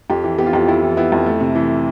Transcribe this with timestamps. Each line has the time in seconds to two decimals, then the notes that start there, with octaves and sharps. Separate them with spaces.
0.10 F2 G4
0.24 E3
0.38 B3 G4
0.46 F4
0.53 F2 G4
0.68 F2 E4
0.83 E3
0.97 B3 E4
1.12 F2
1.26 A3
1.41 C3
1.55 E3